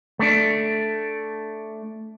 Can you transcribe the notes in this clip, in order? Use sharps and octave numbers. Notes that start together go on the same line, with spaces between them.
A3 D4